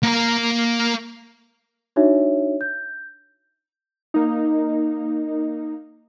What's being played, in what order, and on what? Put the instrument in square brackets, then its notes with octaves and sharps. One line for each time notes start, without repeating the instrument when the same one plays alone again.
[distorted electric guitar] A#3 A#5
[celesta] D4 D#4 F#4 C#5 E5
G6
[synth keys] A#3 D#4